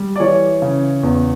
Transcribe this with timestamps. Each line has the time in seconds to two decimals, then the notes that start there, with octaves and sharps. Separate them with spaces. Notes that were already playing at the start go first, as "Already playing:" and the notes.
Already playing: G3
0.16 D5
0.20 E3 C#5
0.62 C#3
1.03 E2